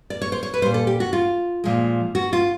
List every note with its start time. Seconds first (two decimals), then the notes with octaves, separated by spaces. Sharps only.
0.10 D5
0.21 C#5
0.32 C5
0.43 C#5
0.54 B4
0.62 A#2 G3 C5
0.74 A4
0.87 G4
1.00 F#4
1.13 F4
1.64 A#2 F3 G#3
2.15 F#4
2.33 F4